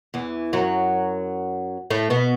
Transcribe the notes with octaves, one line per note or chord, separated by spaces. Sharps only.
E2 E3
F#2 F#3
A2 A3
B2 B3